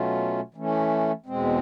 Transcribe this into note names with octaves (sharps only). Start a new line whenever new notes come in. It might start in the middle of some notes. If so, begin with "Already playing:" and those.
Already playing: B2 F#3 A3 C#4 F4
E3 A3 C#4
E2 B2 G#3 C4